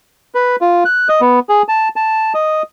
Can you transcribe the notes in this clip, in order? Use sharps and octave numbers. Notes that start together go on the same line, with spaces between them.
B4
F4
F#6
D#5
B3
G#4
A5
A5
D#5